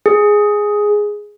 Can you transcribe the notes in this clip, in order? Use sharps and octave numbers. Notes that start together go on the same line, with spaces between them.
G#4